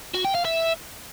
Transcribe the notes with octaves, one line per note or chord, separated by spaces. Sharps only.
F#4
G5
F5
E5